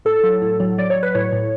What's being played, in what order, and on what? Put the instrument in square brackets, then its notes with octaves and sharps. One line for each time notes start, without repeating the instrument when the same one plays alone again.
[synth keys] A2 A4
F#3
A2
F#3
F#3 D5
C#5
F#3
B4
A2 C#5
A2